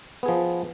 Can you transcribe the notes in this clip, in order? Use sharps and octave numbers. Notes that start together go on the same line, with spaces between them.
F3 B3 G#4